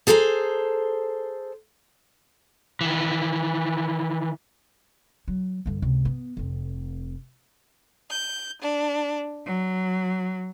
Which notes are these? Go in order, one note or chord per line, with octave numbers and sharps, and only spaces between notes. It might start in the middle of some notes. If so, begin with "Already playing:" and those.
G#4 A4 C5 G5 A#5
D#3 E3
F#3
G2 D3
C#2 C3
B3
F1 C4
G6
D4
F#3